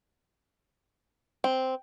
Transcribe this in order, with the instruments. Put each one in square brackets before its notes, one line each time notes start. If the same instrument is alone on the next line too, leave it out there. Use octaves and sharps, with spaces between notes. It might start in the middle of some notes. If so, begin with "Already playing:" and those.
[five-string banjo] C4